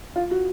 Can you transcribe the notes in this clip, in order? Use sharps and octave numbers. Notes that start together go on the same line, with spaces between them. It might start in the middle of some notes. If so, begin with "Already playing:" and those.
F4
F#4